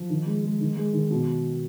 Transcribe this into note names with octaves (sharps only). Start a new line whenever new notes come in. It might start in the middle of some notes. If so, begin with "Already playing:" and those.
Already playing: F3
D#3
G#3
G#3
D#3
G#3
D#3
B2